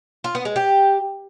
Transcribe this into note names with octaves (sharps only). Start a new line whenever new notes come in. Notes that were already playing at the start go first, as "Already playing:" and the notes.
F4
B3
G#3
G4